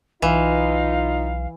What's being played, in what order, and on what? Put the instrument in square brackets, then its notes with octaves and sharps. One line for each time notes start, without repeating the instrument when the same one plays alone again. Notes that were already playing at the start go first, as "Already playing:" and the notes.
[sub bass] B1 [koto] E3 [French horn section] D#4 F4 [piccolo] F5